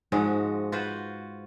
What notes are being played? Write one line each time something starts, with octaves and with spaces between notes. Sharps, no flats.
G#2 F3 G#3 F#4
F4 F#4 B4 C5